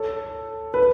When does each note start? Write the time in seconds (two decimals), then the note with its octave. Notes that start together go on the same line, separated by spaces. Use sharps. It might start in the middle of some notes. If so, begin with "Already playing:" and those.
Already playing: A4 C#5
0.74 B4